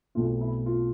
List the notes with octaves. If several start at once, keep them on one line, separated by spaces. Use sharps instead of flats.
B1 B2 A3 C4 F4
E4
F4